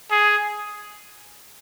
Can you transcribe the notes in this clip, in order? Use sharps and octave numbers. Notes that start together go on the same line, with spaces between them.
G#4